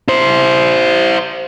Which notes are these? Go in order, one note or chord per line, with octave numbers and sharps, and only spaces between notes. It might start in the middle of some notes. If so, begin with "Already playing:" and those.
E4 C5